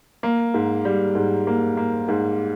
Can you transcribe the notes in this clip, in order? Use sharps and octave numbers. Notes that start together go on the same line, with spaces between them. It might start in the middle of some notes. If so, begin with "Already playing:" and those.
A#3
G#2
G3
G#2
A#3
A#3
G#2